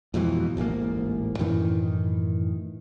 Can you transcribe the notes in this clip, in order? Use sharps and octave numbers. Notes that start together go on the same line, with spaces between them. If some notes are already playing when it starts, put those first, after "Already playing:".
F2 G#2 B2 E3
D1 A1 G#2 A#3
F#2 A2 D#3 E3